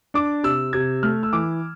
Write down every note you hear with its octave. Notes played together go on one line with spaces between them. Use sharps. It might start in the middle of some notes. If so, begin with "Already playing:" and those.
D4 D6
C3 E6
C3 G#6
A3 F6
E6
E3 D6